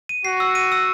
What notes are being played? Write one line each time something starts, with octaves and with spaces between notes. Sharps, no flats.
D#7
F#4 C7
E6
D#7
E6